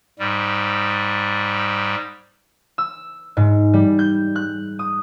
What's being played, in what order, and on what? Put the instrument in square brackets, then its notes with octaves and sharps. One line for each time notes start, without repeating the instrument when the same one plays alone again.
[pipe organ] G#2 G3
[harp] E6
G#2
G3
G6
F#6
D#6